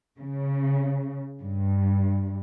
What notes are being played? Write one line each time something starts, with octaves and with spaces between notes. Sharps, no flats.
C#3
G2